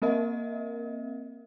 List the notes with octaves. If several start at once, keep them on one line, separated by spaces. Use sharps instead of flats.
A#3 C4 A#4 D#5 E5